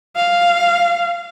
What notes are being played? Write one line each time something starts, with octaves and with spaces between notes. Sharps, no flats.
F5